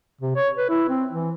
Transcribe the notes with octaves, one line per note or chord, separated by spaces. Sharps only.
C3
C#5
B4
E4
C4
E3